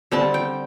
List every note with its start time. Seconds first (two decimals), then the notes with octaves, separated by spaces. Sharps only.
0.11 D3 G3 C4 A5
0.34 G5